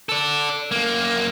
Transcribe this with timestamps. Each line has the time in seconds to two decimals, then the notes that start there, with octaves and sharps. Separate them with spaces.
0.09 A4 D5
0.71 F#2 A#3